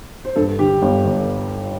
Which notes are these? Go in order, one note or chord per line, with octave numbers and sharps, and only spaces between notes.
C5
G2 A4
D3 G4
G1
G1